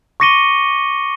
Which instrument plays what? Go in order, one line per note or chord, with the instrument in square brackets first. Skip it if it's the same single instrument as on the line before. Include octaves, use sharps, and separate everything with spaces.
[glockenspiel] C#6 D6 A#6 C#7 D#7 G7